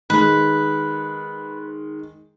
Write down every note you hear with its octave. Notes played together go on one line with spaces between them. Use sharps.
D#3 G#3 B4